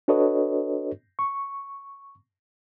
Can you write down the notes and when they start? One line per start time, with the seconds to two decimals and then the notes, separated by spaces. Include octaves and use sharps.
0.08 D4 F#4 A4 B4 C#5 D#5
1.19 C#6